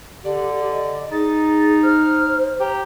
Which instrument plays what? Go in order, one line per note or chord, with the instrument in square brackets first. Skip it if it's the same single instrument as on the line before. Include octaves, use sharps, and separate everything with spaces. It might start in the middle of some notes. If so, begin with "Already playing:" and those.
[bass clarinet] D3 [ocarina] G4 [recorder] D5
[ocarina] D#5
[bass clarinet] D#4 [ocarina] G#4 [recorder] A6
[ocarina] C5 [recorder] F6
[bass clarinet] G4 [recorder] A#5